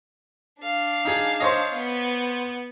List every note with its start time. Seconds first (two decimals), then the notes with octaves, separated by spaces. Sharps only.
0.61 D4 F5
1.05 D#4 G#4
1.40 C5 C#5 D#5
1.73 B3